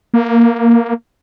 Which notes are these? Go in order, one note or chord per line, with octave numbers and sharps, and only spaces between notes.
A#3